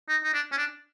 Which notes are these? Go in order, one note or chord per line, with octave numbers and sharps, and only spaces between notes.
D#4
D#4
D4
C#4
D4